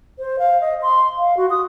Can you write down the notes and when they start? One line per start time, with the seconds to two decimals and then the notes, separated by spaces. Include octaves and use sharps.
0.19 C5
0.39 F5
0.61 D#5
0.82 C6
1.18 F5
1.37 F#4
1.51 D#6